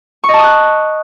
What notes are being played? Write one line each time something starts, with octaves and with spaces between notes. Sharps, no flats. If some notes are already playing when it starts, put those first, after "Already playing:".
C#6
D#5
A5
D#6
F#6